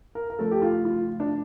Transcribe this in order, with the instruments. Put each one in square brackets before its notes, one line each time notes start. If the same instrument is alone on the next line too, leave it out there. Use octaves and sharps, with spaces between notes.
[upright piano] A#4
A#4
[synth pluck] C#3 F3 A3 [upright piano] A4
[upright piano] G4
F4
F4
D4